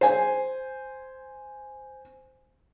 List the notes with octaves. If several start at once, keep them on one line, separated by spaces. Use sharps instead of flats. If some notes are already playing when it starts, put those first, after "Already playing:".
C5 G#5